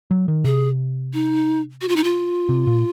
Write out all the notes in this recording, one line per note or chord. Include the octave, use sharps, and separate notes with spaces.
F#3
D#3
C3 G#4
D#4
F#4
F4
D#4
F4
C3
A#2